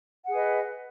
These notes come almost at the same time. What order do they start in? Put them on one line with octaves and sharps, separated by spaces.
F#5 G#4 B4 D#5